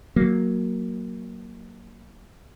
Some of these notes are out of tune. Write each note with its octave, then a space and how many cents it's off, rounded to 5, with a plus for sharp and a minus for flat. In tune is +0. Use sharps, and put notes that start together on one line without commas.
F#3 +0 A#3 +0